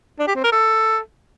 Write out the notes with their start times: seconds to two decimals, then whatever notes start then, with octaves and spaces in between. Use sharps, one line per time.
0.19 D4
0.28 G4
0.36 C4
0.44 A#4
0.52 A4